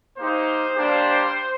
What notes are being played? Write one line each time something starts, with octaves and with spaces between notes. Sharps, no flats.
A#3 D#4 G4 C5
G3 A#3 D4 G4